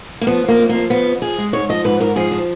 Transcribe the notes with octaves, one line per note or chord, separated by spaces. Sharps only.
A#3
F3 B3
F3 A#3
F2
F3 A#3
F3 B3
F2
F3 G#4
G#3
G#2 C#5
F3 D#5
G#2 B4
G#2 A#4
F3 G#4
F3